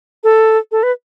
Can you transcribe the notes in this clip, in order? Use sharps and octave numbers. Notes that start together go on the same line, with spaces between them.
A4
A4
B4